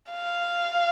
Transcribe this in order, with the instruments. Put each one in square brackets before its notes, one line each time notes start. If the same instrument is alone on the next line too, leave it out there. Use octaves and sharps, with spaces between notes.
[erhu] F5